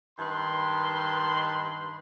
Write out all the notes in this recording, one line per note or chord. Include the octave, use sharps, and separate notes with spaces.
G2 D#3 B4 C6